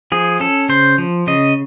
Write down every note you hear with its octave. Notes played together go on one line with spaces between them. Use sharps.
F3 G#4
C#4 A4
C#3 C5
F3
C#3 D#5